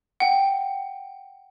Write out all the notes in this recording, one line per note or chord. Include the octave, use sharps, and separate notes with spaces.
F#5 G5